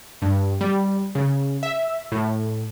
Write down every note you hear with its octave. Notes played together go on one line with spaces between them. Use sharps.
G2
G3
C#3
E5
A2